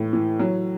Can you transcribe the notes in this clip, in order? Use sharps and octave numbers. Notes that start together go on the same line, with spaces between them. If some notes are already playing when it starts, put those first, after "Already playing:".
Already playing: A2 E3
E3
F#3